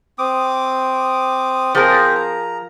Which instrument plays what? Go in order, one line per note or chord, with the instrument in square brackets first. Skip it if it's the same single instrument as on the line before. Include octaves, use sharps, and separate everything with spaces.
[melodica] C4 D6 D#6
[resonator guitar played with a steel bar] F3 G#4 A#4 [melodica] C4 C5
[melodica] A#5